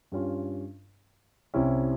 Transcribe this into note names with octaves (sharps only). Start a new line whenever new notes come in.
G2 G3 C#4 F4
C2 C3 G3 C#4 E4